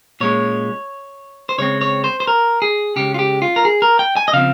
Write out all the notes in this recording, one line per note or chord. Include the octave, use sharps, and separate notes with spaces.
A#2 G#3 C#4 C#5
C5
C#3 G#3 C4 C#5
C#5
C5
C5
A#4
G#4
C#3 G#3 C#4 G4
F4
G4
F4
A#4
G#4
A#4
G5
G#5
D#5
C#3 F3 C4 F5